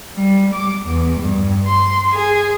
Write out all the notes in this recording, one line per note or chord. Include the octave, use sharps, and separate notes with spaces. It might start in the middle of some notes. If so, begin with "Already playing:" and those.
G3
D6
E2
G2
C6
G#4